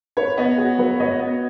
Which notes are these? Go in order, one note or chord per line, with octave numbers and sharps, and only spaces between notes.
B4 C#5
B3 D#5
F#4 G#4
F#3 B4
C#5 D#5
B3